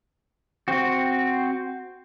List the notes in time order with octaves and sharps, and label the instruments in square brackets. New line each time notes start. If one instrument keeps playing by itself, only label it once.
[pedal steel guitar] C4 F#4